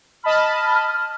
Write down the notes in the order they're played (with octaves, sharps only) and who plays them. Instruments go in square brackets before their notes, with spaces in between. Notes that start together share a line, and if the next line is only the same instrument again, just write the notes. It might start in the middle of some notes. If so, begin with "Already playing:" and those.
[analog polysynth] D#5 A5 B5 [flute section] F6